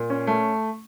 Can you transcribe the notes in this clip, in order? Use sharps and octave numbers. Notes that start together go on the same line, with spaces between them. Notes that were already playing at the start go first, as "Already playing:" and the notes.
Already playing: A#2
C#4
A3